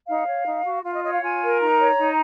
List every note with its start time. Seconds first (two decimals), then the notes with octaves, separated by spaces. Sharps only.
0.09 D#4 F5
0.27 C#5
0.46 D#4
0.65 F#4
0.84 F4 F5
0.94 D#5
1.04 C#5 D#5
1.13 F5
1.22 F4 G#5
1.42 A#4
1.61 D#4 A#5
1.79 C#5
1.99 D#4